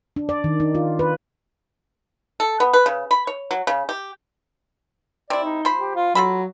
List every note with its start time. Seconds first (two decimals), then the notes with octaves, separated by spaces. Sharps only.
0.16 D4
0.29 D5
0.44 D#3
0.60 D#4
0.75 F4
0.99 B4
2.40 A4
2.60 B3
2.73 B4
2.86 C#3
3.11 B5
3.27 C#5
3.51 F#3
3.67 C#3
3.89 G4
5.30 C3 E4 D5
5.43 D#4
5.65 F3 C5 B5
5.79 G4
5.95 F4
6.15 F#3 F4 A4 B5